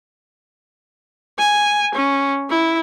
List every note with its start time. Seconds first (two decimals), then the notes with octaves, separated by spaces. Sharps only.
1.38 G#5
1.94 C#4
2.50 E4